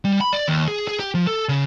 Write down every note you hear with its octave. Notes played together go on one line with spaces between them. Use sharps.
G3
B5
D5
D#2
G#4
G#4
G4
F3
A4
C#3